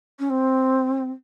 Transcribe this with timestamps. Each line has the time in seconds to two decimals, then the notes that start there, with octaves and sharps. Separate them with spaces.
0.19 C#4
0.30 C4